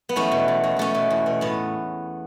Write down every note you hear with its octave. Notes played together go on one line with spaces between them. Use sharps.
B3
E2 A3 C#4
B2
E2
B2
E2 A3 C#4
B2
E2
B2
A2 B3